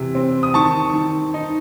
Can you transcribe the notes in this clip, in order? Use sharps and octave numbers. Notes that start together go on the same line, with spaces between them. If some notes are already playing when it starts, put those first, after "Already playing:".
Already playing: C3 E3
C4
D#6
D#3 A5 C#6
D#3
D#4